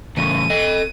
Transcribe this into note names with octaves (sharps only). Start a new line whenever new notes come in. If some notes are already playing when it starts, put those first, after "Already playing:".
A2 C#3 E3 D#7
A4 D#5